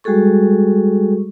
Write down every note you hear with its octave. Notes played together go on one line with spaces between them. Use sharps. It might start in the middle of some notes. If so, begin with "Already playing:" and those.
G3 G#3 F#4 G#4 A4 C#6